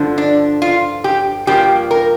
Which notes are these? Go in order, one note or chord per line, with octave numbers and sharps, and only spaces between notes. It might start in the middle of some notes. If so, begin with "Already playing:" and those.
Already playing: G2 D3 F3
D4
F4
G4
G2 F3 A#3 G4
A#4